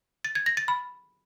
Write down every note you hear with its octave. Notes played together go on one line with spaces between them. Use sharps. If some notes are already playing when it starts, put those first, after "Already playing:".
A6
G#6
A#6
A6
B5